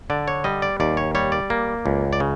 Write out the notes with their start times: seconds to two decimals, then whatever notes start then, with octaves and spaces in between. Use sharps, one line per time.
0.10 D3 D5
0.28 C#5
0.44 G3 D#5
0.62 D5
0.80 D#2 D5
0.97 C#5
1.15 G3 C#5
1.32 D5
1.50 A#3
1.86 C#2
2.13 D5
2.20 C#3